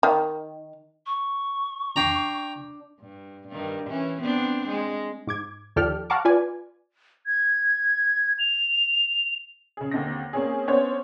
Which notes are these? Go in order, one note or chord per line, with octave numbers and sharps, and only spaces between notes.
D#3
C#6
D4 G5 A#5 C7
G2
G2 D#3
E3 C#4
B3 C4 D4
G#3
G#2 D6 G#6
D#2 F3 G4 A4 D5 F6
F5 F#5 A5 A#5 C#6 D6
F4 B4 D5 G#5
G#6
F7
C#3 G#4
D#2 D3 C4 A#6
A#3 C4 C#4 G#4
B3 C#4 D4 C5 C#5